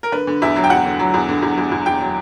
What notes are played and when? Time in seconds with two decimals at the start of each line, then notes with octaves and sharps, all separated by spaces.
0.03 A#4
0.12 D3 B4
0.27 D3
0.42 E2 E5
0.56 F#3
0.64 G5
0.70 E2 F#5
0.85 D3
0.99 F#3
1.14 E2
1.29 D3
1.42 E2
1.58 E2
1.71 E2
1.86 E2 G5
2.01 F#3